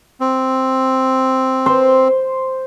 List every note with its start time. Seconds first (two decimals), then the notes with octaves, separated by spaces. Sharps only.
0.20 C4
1.66 C5